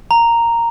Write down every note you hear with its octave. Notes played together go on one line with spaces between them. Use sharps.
A#5